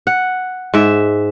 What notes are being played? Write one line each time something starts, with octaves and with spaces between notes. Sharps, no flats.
F#5
G#2 E5